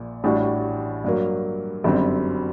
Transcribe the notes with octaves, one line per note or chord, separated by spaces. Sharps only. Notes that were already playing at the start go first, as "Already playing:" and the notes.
Already playing: A#1 A#2
A1 A2 G3 D4 F#4
G2 F#3 A#3
G1 F#2 D3 G3 C4